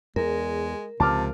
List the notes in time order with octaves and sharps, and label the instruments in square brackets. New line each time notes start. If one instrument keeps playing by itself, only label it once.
[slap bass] E2 [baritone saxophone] G#3 [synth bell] A#4
[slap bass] C#2 F3 [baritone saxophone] C3 [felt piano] A5 D6 F6